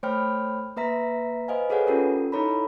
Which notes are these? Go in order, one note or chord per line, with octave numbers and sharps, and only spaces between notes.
A3 C5 C#5 G5 B5 F6
A#3 B4 E5 A#5 B6
B4 C5 D#5 F5 G#5
G#4 A4 B4 C#5 F#5 G#5
C#4 F4 G4 A4 A#4
D#4 E4 A4 C#5 A#5 B5